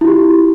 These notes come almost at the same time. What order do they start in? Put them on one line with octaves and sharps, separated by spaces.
E4 F4 G4